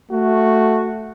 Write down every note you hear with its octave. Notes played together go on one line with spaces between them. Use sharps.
A3 F#4